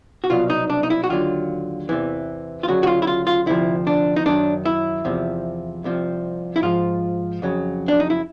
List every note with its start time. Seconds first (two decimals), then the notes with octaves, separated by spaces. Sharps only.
0.24 F#4
0.30 C2 B2 F#3 F4
0.50 D#4
0.70 D4
0.83 D#4
0.90 E4
1.04 F#4
1.10 D#2 D3 F#3 F4
1.89 E2 C3 E3
2.63 F4
2.68 D2 C#3 F#3 F#4
2.83 F#4
2.87 F4
3.02 E4
3.07 F4
3.27 F4
3.46 D2 C3 F3 E4
3.87 D4
4.16 D#4
4.26 F#2 D#3 F#3 D4
4.65 E4
5.05 E2 C3 F3
5.84 C2 C3 F3
6.56 E4
6.62 G#2 F3 F4
7.42 F2 C#3 F#3
7.88 D4
8.00 D#4
8.10 E4